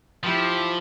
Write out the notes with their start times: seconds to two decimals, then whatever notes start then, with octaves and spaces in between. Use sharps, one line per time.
0.23 F3 E4 G4